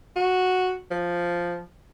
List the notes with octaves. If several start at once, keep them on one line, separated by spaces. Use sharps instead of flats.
F#4
F3